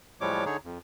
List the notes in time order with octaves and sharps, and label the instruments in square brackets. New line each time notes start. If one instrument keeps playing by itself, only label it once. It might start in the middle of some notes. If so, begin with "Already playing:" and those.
[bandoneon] A2 F3 G3 G#3 C#5 D6
D3 D#4 G#4 C#5
F2